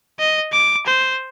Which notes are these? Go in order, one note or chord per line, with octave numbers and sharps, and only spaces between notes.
D#5
D6
C5